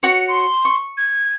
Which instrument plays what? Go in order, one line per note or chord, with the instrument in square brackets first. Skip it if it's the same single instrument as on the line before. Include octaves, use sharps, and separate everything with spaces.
[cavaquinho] F#4 C#5
[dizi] C6
[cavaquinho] C#6
[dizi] G#6